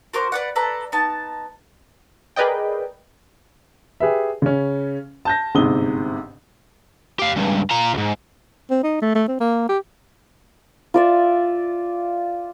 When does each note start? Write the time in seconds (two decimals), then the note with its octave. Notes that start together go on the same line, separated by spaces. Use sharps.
0.13 F#4 A#4 C5 D6
0.32 B4 D5 F#5
0.56 A4 B4 D5 A#5
0.92 B3 D#4 A5
2.36 G#4 A#4 B4 D5 D#5 G5
4.00 G4 G#4 B4 E5
4.42 C#3 C#4
5.25 A5 G6 A#6
5.55 G1 G#2 C3 D#6 G7
7.19 G4 F5
7.36 C#2 G2
7.71 F4 A#5
7.93 C#2 G#2
8.70 C4
8.83 D#4
9.02 A3
9.15 A3
9.28 C4
9.40 A#3
9.69 G4
10.94 F4 D5 E5